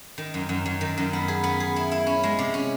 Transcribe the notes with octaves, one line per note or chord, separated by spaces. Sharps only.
D#3
F#2
F#2
F#2
D#3
F#2
B3
G#4
B3
G#4
E4
E4
C#4
G#3
C3
C#4